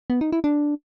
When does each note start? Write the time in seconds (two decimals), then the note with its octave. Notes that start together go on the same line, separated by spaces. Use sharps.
0.10 B3
0.21 D#4
0.32 E4
0.44 D4